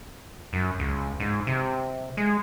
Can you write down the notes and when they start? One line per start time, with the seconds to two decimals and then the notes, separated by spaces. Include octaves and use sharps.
0.53 F#2
0.79 C#2
1.20 G#2
1.47 C3
2.17 G#3